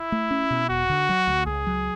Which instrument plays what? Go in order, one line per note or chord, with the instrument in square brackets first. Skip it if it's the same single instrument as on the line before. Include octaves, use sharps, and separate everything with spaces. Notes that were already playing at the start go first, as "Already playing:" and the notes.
Already playing: [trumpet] E4
[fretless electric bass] A3
C#4
B2
[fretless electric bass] E1 [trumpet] F#4
[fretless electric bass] D3
F#3
D2
[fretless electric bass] C#2 [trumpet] G#4
[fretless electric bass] F#3